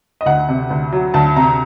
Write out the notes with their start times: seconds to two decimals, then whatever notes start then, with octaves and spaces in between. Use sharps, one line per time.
0.21 D#5
0.26 D2 F#5
0.49 C3
0.70 D2
0.92 F#3
1.14 D2 A5
1.36 C3 A#5